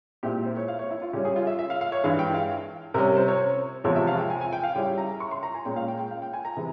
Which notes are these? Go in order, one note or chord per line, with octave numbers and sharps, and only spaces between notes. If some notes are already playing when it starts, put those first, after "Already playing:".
A#2 G#3 C4 E4 G4
C5
C#5
F5
C#5
E4
F4
C#3 G3 C#4 G4
G#4
F4
E5
E5
F5
F5
C#5
G2 E3 G#3 F5
G5
F5
C3 G3 C#4 A#4
C5
C#5
E2 C3 F3 G#3 C#5
E5
F5
G5
G#5
G#5
G5
F5
C#3 G3 C#4 E4 G5
A#5
C#6
C6
A#5
G#5
A#2 G#3 C#4 G5
F5
G5
G5
F5
G5
G#5
A#5
C3 E3 G#3